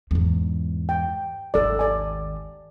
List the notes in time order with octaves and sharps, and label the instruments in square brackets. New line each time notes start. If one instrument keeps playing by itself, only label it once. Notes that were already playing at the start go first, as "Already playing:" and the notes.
[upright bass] E2 G#2
[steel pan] G5
[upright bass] G#1 D#2 [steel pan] A4 D5
[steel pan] D5 G#5